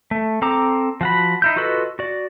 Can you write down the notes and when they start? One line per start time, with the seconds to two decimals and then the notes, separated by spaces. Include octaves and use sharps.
0.11 A3
0.42 C4 A4 A#5 D6
1.01 F3 F#4 B5
1.42 D#4 E4 G6
1.56 F4 F#4 A4 B4 D#5
1.99 F#4 D5